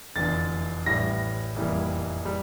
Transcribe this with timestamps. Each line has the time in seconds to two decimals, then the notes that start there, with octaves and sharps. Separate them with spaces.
0.16 F1 E2 D3 A6
0.86 A1 A2 G3 A#6
1.56 F1 E2 E3 G3 A#3
2.25 G3